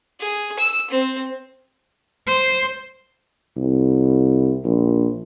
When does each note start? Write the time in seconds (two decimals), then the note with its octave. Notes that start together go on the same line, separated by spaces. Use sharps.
0.20 G#4
0.59 E6
0.90 C4
2.27 C5
3.57 C2
4.65 A#1